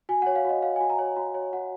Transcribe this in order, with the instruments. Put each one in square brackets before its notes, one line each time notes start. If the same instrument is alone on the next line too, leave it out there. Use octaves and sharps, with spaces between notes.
[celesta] F#4 G#5
C#5 F#5
F5
F#4 D#5
C#5 F5
F#4 G#5
A#5
C#5
F#4 A#5
C#5
F#4 F#5